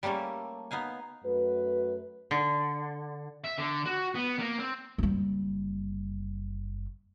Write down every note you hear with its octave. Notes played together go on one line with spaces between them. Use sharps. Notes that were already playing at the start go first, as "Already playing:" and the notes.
G3 A3 A#3 C#4 A4
B3 D#4 F5 G#5
F#2 A3 F#4 B4
D3
E5
D3
F#4
B3
A#3
C4
F#1 G3